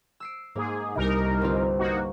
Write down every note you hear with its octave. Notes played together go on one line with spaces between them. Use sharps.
E6 C7 D7
G#2 A#3 G#4
C2 D#4 A#4
G1 C4 F4
A#3 D#4 F#4